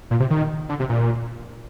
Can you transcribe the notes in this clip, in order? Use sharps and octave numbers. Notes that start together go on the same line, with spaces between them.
A#2
C3
D#3
D3
C3
A#2